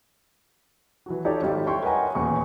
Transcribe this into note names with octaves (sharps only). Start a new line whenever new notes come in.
E3 F#3 F#4
D#4 F4 G4 A4 C#5 D5
G#1 G3
E4 C#5 G5 C6 C#6
A#4 B4 D#5 F#5 G#5 A#5
D#1 E2 C#6